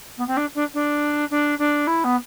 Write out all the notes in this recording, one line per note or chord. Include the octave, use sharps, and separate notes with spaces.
B3
C4
D4
D4
D4
D4
D4
E4
B3